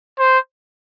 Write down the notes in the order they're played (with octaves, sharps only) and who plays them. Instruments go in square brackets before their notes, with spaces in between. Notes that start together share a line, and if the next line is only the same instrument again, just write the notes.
[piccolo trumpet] C5